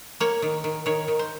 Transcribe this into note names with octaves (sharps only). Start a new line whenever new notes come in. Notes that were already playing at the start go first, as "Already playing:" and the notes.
A#3 C#5
D#3
D#3
D#3 C#5
D#3
C5